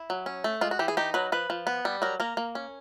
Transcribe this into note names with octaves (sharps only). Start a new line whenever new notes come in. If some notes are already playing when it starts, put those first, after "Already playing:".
Already playing: E4
F#3
C#4
A3
G#3 F4
F#4
E3 G4
G#4
D#4 G4
F#3 B4
F3 B4
F3
B3
G3
F#3 A#4
A#3 A#4
A#3
C#4